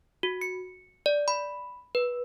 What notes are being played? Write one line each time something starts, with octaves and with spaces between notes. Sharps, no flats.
F#4
C#7
D5
B5
B4